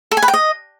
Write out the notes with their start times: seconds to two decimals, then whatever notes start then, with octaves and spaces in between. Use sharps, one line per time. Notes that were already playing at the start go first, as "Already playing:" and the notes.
0.11 A4
0.17 G#5
0.23 B4
0.28 G5
0.34 D#5